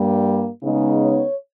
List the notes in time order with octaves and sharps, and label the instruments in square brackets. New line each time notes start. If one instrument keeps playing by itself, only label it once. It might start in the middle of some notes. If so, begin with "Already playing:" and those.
Already playing: [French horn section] G2 G3 A#3
C#3 G#3 B3 D#4
C#5